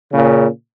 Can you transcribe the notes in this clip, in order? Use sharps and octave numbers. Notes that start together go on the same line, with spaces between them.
A#2 C#3